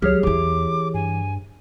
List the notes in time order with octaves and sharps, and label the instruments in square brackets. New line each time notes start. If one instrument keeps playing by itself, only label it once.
[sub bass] C#2 [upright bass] F#3 [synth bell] G4 G#4 C#5 [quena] F6
[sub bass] E2 [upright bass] E3 E4 [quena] D6
[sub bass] G2 [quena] G#5